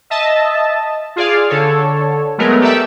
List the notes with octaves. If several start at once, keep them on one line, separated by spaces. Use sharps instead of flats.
D#5 E5 A5
F4 G#4 D5 F5
D3 A4 C#5
F#3 G#3 A3 B3 A#4 B4
G4 A4 D5 E5